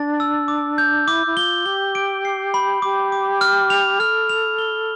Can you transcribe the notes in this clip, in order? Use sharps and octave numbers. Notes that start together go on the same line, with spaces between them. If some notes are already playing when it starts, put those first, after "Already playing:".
Already playing: D4 A6
E6
D6
G6
E4 D6
E4
F4 G7
G4 G7
D7
C7
B5
G4 D6
D6
F6
F7
A4 F6
F7
G7